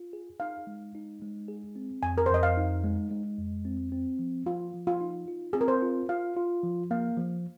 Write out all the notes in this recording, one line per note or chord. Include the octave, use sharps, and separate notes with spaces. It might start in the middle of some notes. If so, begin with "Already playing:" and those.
Already playing: F4
G#4
D#4 F5
G#3
D#4
G#3
G#4
C4
F2 G#5
A#4
C5
F2 D#5
F5
D#4
G#3
G#3
F2
C4
C4
F3
F3 F4
F3
F4
D#4
F4
C4 G#4
A#4
C5
F4
F4 F5
F4
F3
A#3 F5
F3